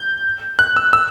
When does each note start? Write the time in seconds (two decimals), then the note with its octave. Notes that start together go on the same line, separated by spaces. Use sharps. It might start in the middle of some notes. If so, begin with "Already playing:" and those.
Already playing: G6
0.59 F#6
0.77 E6
0.93 E6